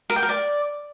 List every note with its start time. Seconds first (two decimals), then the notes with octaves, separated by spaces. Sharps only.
0.10 A#4
0.16 G5
0.22 A#4
0.29 D5